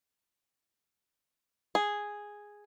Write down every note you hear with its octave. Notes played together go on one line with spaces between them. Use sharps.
G#4